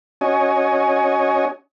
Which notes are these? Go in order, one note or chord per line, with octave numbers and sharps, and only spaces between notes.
C#4 F#4 C#5 D#5 G#5